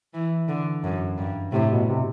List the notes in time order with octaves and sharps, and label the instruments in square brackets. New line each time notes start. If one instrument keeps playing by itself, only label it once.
[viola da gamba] E3
D3
F#2
G2
[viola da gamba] A2 [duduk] C3
[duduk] B2
C3